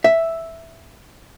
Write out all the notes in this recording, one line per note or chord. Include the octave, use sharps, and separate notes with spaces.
E5